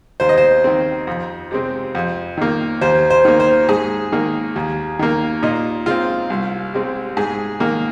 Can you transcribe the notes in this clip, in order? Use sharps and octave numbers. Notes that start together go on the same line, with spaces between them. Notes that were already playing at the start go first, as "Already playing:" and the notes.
D#2 C5
D#5
C5
D#3 C4
F2
C3 G#3 C4
F2
D#3 A#3
D#2 C5
C5
D#3 A#3
C5
G#2 G#4
D#3 A#3
D#2
D#3 A#3
A#2 D#4
G#3 C4 F4
C2
C3 G#3 C4
G#2 G#4
D#3 A#3